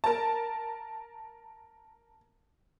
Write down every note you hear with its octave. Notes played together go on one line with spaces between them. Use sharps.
A#4 A5